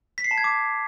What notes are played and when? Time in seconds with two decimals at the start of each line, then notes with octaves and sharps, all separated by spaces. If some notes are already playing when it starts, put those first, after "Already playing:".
0.18 B6
0.24 C7
0.31 A5
0.38 G#6
0.44 D6